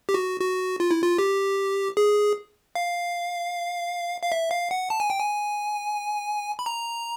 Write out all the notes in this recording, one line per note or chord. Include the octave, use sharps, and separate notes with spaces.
G4
F#4
F#4
F4
E4
F4
G4
G#4
F5
F5
E5
F5
F#5
A5
G#5
G5
G#5
B5
A#5